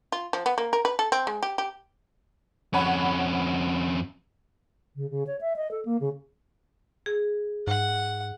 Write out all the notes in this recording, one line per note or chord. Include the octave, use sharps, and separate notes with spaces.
F4
F3
B3
A#3
A#4
B4
A4
C4
G#3
G4
G4
F2 C#4 C#5 F#5 B5
C#3
C#3
C#5
E5
D#5
A4
A#3
C#3
G#4
G#2 F#5